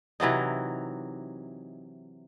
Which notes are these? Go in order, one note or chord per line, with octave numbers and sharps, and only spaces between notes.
C3 E3 F#3 D#4